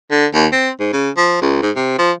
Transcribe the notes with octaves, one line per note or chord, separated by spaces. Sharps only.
D3
D#2
C4
G#2
C#3
F3
C#2
G#2
C3
F3